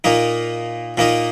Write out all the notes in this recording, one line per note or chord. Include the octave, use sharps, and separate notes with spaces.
A#2 A#3 D#4
A#2 A#3 D#4